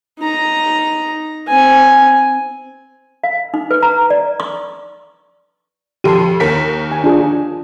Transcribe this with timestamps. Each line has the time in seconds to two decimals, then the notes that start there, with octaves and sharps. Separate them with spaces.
0.20 D#4 A#5
1.48 C4 G#5
3.24 F5
3.54 D#4
3.71 B4
3.83 A#5
4.10 D5
4.40 C#6
6.04 F2 G4 A4 C6 D#7
6.40 D#2 A#4 B6
6.92 G#5
7.04 D4 F4 G#4